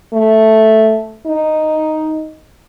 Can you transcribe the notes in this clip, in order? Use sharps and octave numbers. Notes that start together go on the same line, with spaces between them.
A3
D#4